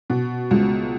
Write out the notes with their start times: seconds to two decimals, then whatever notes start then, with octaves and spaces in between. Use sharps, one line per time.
0.10 B2
0.51 C#2